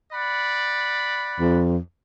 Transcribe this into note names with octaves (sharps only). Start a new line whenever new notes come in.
D5 F#5 B5
F2